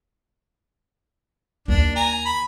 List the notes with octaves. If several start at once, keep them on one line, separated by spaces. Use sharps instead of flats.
D#2 A#3 D4
G#5 A#5
B5